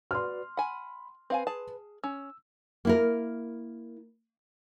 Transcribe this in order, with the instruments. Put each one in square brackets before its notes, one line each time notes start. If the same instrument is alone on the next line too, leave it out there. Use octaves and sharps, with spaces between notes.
[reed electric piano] F#4 B4 D5 [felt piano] C6 F6
[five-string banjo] F#5 G#5 [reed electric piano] B5
[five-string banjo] C4 F5 G#5 [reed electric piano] B4
[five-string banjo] G#4 A5
[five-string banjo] C#4 [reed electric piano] E6
[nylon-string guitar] A#3 E4 A#4